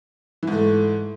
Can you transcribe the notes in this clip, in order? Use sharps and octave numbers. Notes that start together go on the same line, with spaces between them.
G#2 E3 A3